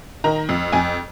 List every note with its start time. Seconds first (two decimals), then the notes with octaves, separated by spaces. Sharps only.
0.24 D#3 A#5
0.49 F2
0.72 F2 G#5